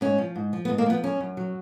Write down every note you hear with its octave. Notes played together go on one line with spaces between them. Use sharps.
G#2 C#4
F3
G#2
F3
B3
G#2
A#3
F3 B3
F#2 C#4
F#2
F#3